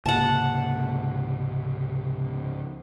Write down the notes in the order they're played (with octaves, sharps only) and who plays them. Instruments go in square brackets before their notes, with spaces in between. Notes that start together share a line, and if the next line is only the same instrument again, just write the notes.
[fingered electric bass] C#2 G#2 A#3 [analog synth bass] C3 [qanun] F#5 A5